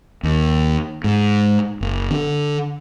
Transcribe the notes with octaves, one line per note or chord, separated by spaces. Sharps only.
D#2
G#2
F#1
D3